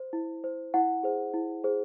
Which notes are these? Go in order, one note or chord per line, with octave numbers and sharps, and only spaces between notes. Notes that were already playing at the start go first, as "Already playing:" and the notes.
Already playing: C5
E4
C5
E4 F#5
G#4 C5
E4
G#4 C5